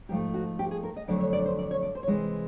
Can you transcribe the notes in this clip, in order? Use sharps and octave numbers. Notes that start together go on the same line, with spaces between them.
G#2 F3 A3 G4
F#4
G4
G#4
A#4
D#5
F2 D3 F#3 A3 D5
C#5
D5
C5
D5
C#5
D5
C5
C#5
C3 E3 G#3 C5